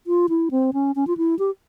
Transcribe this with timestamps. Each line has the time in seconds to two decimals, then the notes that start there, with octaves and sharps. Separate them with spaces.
0.07 F4
0.29 E4
0.51 C4
0.73 C#4
0.96 C#4
1.07 F4
1.17 E4
1.39 G4